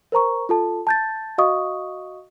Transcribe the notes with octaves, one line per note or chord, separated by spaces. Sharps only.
A#4 C5 A#5 C#6
F4 A4 A5
A5 G6 A6
F#4 D#5 F5 C#6 D#6